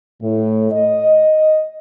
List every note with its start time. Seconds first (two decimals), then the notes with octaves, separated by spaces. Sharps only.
0.22 A2
0.72 D#5